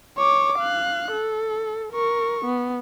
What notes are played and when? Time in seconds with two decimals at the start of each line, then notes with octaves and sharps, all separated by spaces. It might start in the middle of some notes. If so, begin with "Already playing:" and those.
0.17 C#5 D6
0.59 F5 F#6
1.13 A4
1.92 A#4 C#6
2.45 B3